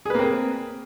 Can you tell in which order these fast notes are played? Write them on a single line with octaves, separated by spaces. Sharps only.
G#4 B4 A#3 C4